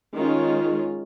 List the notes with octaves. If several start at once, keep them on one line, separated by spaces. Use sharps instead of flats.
D#3 G#3 C#4 F4